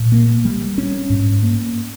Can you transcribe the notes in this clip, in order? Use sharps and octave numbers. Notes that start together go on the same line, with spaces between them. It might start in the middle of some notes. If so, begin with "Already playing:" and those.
Already playing: A#2
A#3
G3
C#4
G#2
A#3